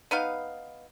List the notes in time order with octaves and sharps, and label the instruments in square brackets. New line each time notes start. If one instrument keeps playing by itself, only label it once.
[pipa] B3 D#4 B4 F5